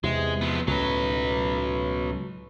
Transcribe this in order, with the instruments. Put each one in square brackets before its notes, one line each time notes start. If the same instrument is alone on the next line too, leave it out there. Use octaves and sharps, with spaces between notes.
[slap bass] E2 C3 [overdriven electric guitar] G#3
[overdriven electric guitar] F3 B3
[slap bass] C#2 A2 [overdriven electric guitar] F#3 B4